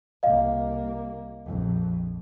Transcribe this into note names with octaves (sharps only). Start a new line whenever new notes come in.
C2 A#3 D#5 F5
A#1 F2